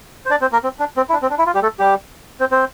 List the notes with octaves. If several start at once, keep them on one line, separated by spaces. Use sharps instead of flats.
C5
D4 D5
C4 C5
A#3 A#4
C4
D4
C4
E4
D4
C4
D4
E4
F4
G3 G4
A3 A4
G3 G4
C4 C5
C4 C5